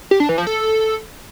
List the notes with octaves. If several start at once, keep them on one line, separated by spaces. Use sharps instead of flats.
G4
D4
E3
F3
A4